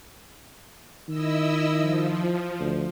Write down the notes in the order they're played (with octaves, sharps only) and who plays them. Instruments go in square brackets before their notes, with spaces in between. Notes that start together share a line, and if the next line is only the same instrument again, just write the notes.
[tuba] D#3 [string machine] E4 D#5 E6
[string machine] F3
[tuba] D2